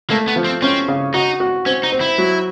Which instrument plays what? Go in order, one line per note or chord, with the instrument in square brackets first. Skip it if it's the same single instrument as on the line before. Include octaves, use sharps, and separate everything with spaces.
[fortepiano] A3 [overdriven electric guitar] A#3
[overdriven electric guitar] B3
[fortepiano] F3
[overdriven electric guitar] C4
[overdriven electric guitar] C4 [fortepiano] C#4
[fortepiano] C#3
[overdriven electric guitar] D#4 [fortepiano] F#4
[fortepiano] F#4
[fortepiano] C4 [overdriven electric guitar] C#4
[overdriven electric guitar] D#4
[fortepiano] C4
[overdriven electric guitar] E4
[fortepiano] F#3